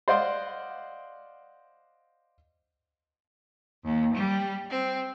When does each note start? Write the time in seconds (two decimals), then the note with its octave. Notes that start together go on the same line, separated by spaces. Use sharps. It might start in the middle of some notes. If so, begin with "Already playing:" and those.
0.08 C5 D5 D#5 F5 F#5 C6
3.84 D#2
4.14 G3
4.70 C4